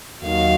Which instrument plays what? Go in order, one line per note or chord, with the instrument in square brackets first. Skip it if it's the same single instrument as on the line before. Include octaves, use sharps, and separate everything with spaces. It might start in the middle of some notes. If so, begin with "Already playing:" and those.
[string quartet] D#2 D#3 F#3 F5